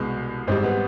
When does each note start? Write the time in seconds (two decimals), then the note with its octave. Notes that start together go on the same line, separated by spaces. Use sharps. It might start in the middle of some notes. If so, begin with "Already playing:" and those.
Already playing: C2 B2 G#3
0.47 G#1 G#2 G3 C4
0.64 B3